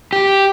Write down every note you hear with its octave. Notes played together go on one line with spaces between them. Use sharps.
G4